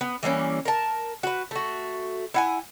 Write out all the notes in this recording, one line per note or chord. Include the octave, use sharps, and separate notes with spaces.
B3
E3 G3 A#3 C#4
A#4 A5
F#4 B4
A3 F#4
E4 F#5 G#5